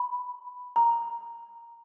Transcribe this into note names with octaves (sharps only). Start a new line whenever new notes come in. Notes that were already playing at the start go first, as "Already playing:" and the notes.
Already playing: B5
A#5